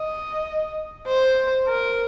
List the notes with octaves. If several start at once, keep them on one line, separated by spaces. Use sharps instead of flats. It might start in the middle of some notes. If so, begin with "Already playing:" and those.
Already playing: D#5
C5
A#4